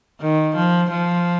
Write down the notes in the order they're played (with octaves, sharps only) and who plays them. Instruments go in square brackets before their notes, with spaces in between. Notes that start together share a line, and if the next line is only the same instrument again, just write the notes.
[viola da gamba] D#3
F3
F3